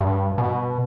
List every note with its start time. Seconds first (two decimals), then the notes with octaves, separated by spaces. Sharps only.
0.01 G2
0.38 B2